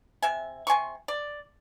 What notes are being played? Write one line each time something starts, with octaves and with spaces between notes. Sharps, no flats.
C3 E5 G#5
C3 G#5 C6 C#6
D5